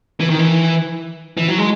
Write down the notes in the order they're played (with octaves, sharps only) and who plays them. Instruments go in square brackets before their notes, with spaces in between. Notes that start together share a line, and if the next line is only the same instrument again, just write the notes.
[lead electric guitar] E3
D#3
E3
E3
F#3
G#3